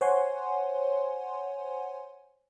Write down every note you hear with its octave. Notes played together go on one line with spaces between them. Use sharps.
C5 C#5 F#5 G#5 C6